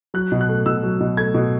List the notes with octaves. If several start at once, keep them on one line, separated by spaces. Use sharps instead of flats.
F#3 F#6
B2
F#6
A3
B2 E6
F#3
B2
A3 G#6
B2